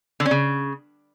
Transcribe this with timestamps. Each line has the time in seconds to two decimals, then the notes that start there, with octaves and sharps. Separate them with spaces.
0.20 D3
0.25 C#4
0.31 C#3